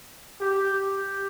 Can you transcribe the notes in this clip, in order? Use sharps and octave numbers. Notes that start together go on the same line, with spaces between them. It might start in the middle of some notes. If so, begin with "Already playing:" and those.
G4
G4